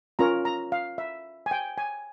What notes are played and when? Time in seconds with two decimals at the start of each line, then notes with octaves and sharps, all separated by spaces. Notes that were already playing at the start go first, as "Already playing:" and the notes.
0.19 C#4 F4 A#4 C#5 A#5
0.45 A#5
0.72 F5
0.98 E5
1.46 G#5
1.51 G5
1.78 G#5